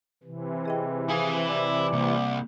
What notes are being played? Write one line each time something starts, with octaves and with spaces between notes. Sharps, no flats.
C3 E3
G#4 D#5 G5
E4 G#4 F5 G#5
D5
C2 A#3